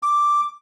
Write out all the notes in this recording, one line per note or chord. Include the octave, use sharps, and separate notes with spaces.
D6